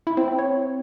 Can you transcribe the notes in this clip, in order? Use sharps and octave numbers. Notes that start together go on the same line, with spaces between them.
E4
C4
C4
C#5